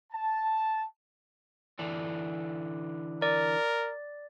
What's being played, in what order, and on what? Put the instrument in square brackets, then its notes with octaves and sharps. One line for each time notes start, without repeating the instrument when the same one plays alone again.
[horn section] A5
[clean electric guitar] D3 E3 D4
[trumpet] A#4 [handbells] D5